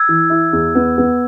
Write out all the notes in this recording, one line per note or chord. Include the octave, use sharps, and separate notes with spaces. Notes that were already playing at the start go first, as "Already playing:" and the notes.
Already playing: E6 G#6
E3
E4
E2
B3
B3